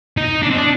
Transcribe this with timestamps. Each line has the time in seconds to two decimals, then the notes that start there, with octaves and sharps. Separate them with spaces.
0.17 D#4
0.42 D4
0.50 C4
0.58 D4